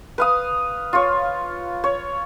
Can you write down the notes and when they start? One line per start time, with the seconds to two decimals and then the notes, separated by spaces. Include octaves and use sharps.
0.18 B4 F5 D#6
0.93 F4 C#5
1.84 C#5